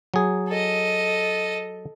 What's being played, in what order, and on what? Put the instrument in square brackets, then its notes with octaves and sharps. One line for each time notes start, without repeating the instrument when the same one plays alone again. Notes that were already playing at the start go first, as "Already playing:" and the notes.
[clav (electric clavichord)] F#3 G#4
[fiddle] A4 D#5